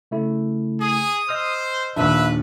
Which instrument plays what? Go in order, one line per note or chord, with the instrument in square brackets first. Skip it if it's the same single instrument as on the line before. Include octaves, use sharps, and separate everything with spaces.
[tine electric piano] C#3 A3 E4
[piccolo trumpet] G#4 [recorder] D#6
[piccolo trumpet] C5 [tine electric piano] D#5 E6 F6
[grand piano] A#1 D#2 [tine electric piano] D4 [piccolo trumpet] B4 [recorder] E5